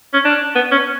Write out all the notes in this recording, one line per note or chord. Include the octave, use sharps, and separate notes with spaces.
C#4
D4
B3
C#4